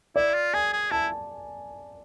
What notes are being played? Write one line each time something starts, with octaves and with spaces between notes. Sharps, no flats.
E4 D5
F4
G#4 G#5
G#4
E4 A5